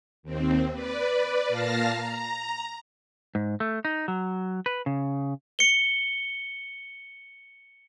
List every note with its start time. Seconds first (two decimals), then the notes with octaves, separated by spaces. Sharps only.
0.23 D#2 C4
0.73 B4 D5
1.48 A#2 F5 A5 F6 A#6
1.93 A#5
3.35 G#2
3.60 A3
3.85 D#4
4.08 F#3
4.66 B4
4.86 C#3
5.59 C#7 G7